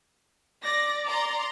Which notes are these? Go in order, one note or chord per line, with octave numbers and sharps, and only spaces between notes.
D5 A#6
A#5 C6